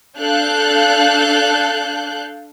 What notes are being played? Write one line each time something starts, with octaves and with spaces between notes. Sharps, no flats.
D4 A4 F5 F#6 G6